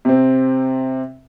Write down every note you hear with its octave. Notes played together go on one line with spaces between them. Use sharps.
C3 C4